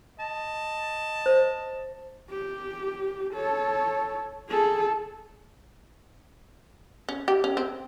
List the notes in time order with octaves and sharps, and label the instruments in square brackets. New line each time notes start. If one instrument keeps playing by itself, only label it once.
[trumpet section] D#5 A5
[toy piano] C5
[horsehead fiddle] G4
A4 C#5
G#4 A4
[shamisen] C#4
G4
C#4
C4